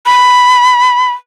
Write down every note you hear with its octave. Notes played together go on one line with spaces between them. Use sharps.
B5